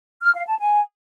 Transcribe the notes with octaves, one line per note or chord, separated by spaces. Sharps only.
F6
F5
A5
G#5